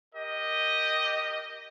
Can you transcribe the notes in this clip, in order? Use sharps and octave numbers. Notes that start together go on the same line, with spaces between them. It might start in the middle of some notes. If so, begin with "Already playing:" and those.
G4 A#4 D#5